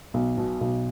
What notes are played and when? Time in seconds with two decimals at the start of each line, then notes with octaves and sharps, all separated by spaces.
0.14 B1
0.37 B2
0.61 B1